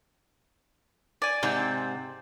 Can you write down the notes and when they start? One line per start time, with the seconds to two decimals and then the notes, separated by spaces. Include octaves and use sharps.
1.22 D5 G#5
1.43 G#2 C3 C4